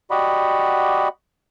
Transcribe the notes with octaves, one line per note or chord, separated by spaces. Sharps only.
F#4 G4 D5 D#5 F#5 B5